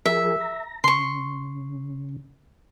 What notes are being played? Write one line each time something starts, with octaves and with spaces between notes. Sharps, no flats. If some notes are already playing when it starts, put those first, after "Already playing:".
F3 G#4 A#4 E5
A#5
C#3 C6 C#6